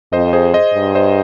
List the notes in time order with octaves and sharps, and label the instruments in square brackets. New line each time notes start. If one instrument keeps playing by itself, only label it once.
[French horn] F2 [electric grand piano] C5 D#5
[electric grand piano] G#4 C5
C5 D#5
[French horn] G2
[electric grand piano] C5 D#5